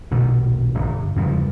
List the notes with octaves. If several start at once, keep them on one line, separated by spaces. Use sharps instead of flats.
D#1 B1 B2 D#3
D1 G1
E2 G2 C#3 F3